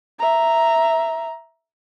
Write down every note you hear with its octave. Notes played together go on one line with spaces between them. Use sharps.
E5 A#5